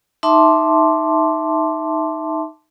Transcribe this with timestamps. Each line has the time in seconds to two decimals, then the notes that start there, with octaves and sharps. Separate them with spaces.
0.23 D#4 E5 A5 C6 D6